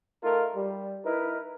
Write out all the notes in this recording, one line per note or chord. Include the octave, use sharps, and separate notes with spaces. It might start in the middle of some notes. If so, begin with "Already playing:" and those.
A3 D#4 F4 A#4
G3
D#4 E4 A#4 B4